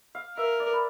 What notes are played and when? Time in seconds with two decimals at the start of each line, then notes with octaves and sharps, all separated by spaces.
0.15 F5
0.37 A#4 E5
0.60 D5
0.73 B4